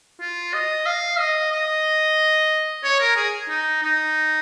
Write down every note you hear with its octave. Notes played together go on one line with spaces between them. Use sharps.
F4
D#5
F5
D#5
D#5
C#5
A#4
G#4
D#4
D#4